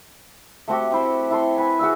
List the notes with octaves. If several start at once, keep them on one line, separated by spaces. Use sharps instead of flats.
A3 C4 F#4 G4
C4 E4 C5
E4 A4 C6
B4 G#5
F#4 G#4 E5 E6